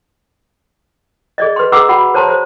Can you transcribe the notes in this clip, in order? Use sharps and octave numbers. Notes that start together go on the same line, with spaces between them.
G#4 D5 D#5
B4 C6
G#4 B4 F#5 A#5 D6 E6
F#4 F#5 B5
C5 C#5 A5 A#5 C6
C5